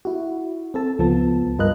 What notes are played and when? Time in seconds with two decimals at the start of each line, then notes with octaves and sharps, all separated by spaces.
0.05 E4 F#4
0.74 C4 A4 A5
0.99 C#2 F3 B3 A5
1.58 G2 F4 A#4 B4 D#5 F#6